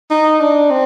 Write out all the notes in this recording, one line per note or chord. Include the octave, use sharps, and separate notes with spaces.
D#4
D4
C4